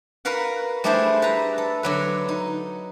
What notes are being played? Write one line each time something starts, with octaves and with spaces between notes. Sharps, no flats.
F#4 A#4 B4 F5 F#5
G3 A3 D4 E4 G#4 C5
B4 A#5
A4
D3 F#3 B4
D#4